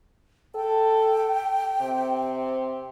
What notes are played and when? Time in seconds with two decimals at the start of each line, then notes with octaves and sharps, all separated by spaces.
0.55 A4 G5
1.81 C3